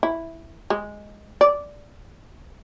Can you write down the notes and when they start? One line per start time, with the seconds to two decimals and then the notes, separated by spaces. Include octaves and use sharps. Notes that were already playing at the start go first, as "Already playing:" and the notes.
0.03 E4
0.70 G#3
1.41 D5